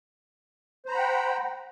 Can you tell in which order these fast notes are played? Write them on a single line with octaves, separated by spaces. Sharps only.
C5 A#5 B5 F#5 G5